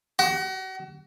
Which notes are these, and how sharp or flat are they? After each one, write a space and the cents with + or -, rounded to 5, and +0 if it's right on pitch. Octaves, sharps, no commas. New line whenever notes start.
F#4 +35